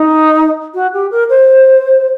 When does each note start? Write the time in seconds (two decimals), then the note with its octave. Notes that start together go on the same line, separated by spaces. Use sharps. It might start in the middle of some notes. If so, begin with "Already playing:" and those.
Already playing: D#4
0.74 F#4
0.93 G4
1.11 A#4
1.29 C5